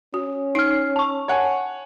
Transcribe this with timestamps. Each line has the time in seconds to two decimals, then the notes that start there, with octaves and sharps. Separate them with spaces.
0.14 C#4 F#4
0.55 D#4 F6 C7
0.96 A5 C#6
1.28 C#5 F#5 G#5